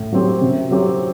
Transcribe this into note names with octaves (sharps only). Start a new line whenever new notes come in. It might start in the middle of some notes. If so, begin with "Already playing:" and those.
Already playing: A2
F#3 C4 G4
C3
F#3 C4 G4